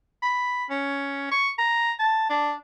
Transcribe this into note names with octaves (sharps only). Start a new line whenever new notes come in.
B5
C#4
C#6
A#5
A5
D4